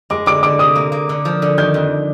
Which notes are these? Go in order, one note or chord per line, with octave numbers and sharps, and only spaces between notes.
G#3 D6
D3 D6
D3 D6
C3 D#6
A#3
A#3
D3
F3
D3
D#3 G6
F2